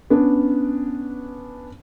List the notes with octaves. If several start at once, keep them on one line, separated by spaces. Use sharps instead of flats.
B3 C#4 D4